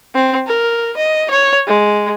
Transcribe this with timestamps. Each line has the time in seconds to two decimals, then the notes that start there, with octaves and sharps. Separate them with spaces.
0.15 C4
0.47 A#4
0.97 D#5
1.31 C#5
1.68 G#3